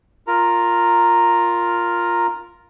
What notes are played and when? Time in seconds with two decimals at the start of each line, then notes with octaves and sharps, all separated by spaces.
0.27 F4 A#4 A#5